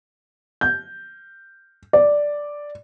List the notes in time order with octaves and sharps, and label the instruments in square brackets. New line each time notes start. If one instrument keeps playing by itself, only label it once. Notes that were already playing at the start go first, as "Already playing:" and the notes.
[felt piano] G6
D5